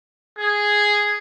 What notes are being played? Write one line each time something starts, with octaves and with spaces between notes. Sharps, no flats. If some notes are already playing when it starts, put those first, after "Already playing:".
G#4